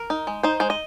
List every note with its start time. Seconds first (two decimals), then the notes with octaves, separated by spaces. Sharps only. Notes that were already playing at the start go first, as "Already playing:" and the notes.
Already playing: A#4
0.10 D#4
0.27 G#3
0.43 D#4 C5
0.60 G#3 C5
0.70 D#5